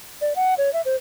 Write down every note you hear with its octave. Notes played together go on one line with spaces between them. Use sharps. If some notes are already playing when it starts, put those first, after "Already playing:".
D5
F#5
C#5
E5
C5